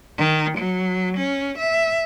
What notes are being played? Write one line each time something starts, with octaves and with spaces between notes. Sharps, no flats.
D#3
F#3
C#4
E5